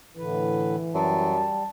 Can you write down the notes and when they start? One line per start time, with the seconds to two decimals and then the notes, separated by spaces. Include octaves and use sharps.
0.17 A2 D3 E3 B4
0.94 F#2 G3 A5